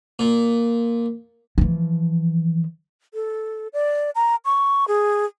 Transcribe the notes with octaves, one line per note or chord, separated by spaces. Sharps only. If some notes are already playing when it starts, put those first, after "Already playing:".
A#2
E3 F3
A4
D5
A#5
C#6
G#4